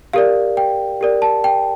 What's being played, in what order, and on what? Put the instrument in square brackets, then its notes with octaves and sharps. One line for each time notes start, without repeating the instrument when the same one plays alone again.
[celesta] G4 A#4 D5 F5
G5
G4 A#4 D5
A5
G5